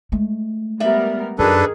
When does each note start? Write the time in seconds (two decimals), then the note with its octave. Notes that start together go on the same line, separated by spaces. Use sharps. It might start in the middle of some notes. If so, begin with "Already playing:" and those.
0.12 G#3 A3
0.80 G3 B3 A#4 D5 E5
1.39 F#2 D#3 D4 G#4 A4 B4